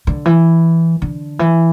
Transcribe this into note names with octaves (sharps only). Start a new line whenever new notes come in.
D3
E3
D3
E3